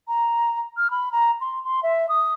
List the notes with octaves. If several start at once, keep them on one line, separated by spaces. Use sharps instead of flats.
A#5
F6
B5
A#5
C6
C6
E5
D#6